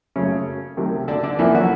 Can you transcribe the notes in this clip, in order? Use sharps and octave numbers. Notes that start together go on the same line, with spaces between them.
F#2 C#3 F#3 A3 C#4
C2 C3 D#3 F#3 A3
D3 D4
D3 D4
C2 A#2 E3 F3 A#3 E4
F#3 F#4